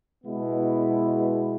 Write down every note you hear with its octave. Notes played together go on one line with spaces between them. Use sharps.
B2 G#3 B3 E4